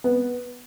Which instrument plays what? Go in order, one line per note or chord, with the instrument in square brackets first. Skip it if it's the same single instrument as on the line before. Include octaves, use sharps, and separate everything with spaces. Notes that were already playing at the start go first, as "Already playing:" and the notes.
[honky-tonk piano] B3